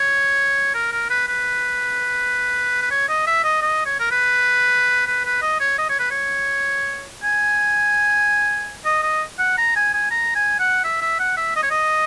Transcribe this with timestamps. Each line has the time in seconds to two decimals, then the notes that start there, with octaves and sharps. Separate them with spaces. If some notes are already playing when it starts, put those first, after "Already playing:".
Already playing: C#5
0.74 A#4
0.92 A#4
1.10 B4
1.27 B4
2.82 B4
2.91 C#5
3.09 D#5
3.27 E5
3.44 D#5
3.62 D#5
3.86 C#5
4.00 A#4
4.11 B4
5.07 B4
5.25 B4
5.42 D#5
5.60 C#5
5.78 D#5
5.89 C#5
5.99 B4
6.11 C#5
7.23 G#5
8.85 D#5
9.03 D#5
9.39 F#5
9.58 A#5
9.76 G#5
9.94 G#5
10.11 A#5
10.35 G#5
10.59 F#5
10.84 E5
11.01 E5
11.19 F#5
11.37 E5
11.56 D#5
11.63 C#5
11.71 D#5